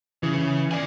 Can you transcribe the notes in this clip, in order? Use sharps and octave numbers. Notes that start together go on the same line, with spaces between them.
C#3 E3
D5 G#5